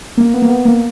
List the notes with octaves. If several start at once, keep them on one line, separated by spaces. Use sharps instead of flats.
A#3
B3
A#3
B3
A#3